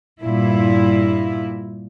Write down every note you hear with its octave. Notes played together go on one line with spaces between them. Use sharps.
G2 A#2 E4